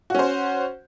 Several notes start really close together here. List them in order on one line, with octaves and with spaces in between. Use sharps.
F#4 C#4 C5